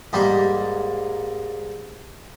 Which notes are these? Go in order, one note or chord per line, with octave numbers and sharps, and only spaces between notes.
G#2 G3 A#3